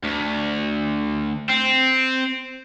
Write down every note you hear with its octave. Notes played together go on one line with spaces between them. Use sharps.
D2
C4